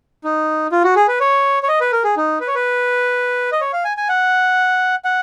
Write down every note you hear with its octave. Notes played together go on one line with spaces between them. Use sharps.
D#4
F4
F#4
G#4
B4
C#5
C#5
D#5
B4
A#4
G#4
D#4
B4
C#5
B4
D#5
C#5
F5
G#5
G#5
F#5
F#5